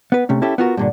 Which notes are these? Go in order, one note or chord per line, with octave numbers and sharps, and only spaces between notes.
B3 B4
C3 A3 C#4
C#4 E4 G4 A4
B3 F4 F#4 A#4
G2 A#2 D3